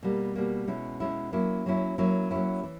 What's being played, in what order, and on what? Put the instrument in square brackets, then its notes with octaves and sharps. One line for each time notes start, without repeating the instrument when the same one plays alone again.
[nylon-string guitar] B2 G3 A#3
B2 G3 A#3
B2 G#3 C#4 E4
B2 G#3 C#4 E4
F#3 A#3 C#4 E4
F#3 A#3 C#4 E4
F#3 A#3 C#4 E4
F#3 A#3 C#4 E4
E3